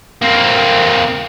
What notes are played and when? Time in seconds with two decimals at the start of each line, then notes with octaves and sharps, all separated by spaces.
0.22 A#3 C4